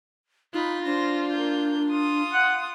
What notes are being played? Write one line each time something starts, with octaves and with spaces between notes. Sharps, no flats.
D#4 F4 B5 F#6
D4 C5 A#6
A#3 G6
F4 D#6
F#5